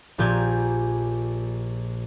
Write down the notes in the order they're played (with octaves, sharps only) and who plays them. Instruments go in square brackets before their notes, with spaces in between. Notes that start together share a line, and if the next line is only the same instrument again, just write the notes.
[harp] A#1 A#2 G4 G#5 G6